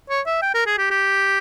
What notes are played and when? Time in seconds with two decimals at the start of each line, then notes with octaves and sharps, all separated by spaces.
0.10 C#5
0.26 E5
0.42 G5
0.54 A#4
0.67 G#4
0.78 G4
0.91 G4